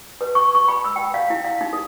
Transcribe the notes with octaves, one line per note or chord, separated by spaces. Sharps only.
B4
C#6
C#6
B5
E6
G5
F5
E4
F5
D#4
A4